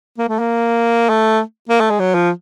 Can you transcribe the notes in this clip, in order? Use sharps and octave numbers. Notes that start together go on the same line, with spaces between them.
A#3
A3
A#3
A3
A#3
A3
G#3
F#3
F3